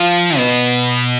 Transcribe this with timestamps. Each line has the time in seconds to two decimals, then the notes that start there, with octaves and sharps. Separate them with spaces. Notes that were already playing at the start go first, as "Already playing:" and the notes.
Already playing: F3
0.37 B2